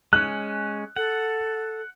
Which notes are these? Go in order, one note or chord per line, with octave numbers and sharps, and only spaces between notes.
G#3 C#4 F#6
A4 F#5